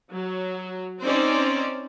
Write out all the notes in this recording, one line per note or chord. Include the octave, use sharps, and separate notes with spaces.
F#3
C4 C#4 D#4 C5 D5